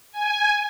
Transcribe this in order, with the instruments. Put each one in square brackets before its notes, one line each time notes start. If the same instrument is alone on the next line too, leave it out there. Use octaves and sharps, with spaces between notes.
[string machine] G#5